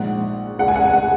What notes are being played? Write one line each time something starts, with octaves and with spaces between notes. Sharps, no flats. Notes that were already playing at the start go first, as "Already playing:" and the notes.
Already playing: A#1 G#2 G#3 F#5
C#2 C#3 G#3 F#5
G#5
F#5
G#5
F#5